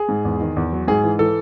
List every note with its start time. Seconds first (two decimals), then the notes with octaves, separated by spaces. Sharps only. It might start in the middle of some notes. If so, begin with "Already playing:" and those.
Already playing: G#4
0.09 G#2
0.25 E2
0.41 D#3
0.56 E2
0.73 F#3
0.88 G#2 G#4
1.03 E3
1.19 E3 A4